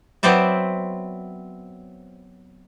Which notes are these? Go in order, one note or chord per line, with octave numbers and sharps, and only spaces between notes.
F#3 B3 C4 C5 D5 E5